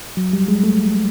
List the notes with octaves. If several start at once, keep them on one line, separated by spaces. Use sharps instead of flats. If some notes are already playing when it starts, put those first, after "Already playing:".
F#3
G3
G#3
A3